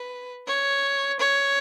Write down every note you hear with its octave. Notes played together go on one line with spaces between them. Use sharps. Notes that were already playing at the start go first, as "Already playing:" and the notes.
Already playing: B4
C#5
C#5